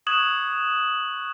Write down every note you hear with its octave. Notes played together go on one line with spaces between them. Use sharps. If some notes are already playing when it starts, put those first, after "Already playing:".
C#6 D#6 F#6 G#6 E7 F#7